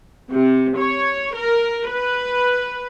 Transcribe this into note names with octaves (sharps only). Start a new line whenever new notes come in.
C3
C#5
A#4
B4